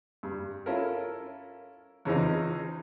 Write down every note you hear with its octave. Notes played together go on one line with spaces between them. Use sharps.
G2
C#4 E4 F4 A4 A#4
E2 C#3 E3 F3 C4 D#4